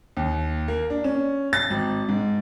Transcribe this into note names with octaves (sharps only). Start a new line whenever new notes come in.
D#2
A#3
D4
C#4
A6
G#1
G#2